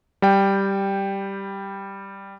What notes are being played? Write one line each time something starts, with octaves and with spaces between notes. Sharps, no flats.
G3 G5